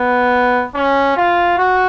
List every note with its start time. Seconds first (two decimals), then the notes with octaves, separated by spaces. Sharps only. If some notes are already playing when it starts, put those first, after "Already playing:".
Already playing: B3
0.75 C#4
1.17 F4
1.58 F#4